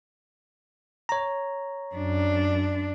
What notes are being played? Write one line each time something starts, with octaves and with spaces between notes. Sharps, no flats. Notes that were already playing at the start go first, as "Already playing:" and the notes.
C#5 A#5
F#2 D4